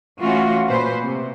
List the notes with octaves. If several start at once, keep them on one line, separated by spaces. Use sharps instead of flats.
E3 A3 C#4 F4 F#4
A#2 B4 C5
C3